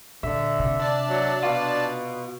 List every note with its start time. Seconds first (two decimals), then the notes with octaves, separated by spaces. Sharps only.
0.23 A#1 D3 E5
0.59 C3
0.80 D4 D5 A5
1.09 F#3
1.43 B2 F4